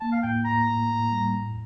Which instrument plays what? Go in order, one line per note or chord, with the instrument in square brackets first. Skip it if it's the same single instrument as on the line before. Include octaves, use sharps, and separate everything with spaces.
[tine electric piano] A#3 [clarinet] A5
[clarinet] F5
[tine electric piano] A2 [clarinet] G5
[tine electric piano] A2 [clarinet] A#5
[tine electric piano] A2
A2
G3
A2